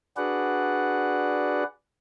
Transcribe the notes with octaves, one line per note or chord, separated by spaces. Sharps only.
D4 F#4 G#4 B4 D5 F#5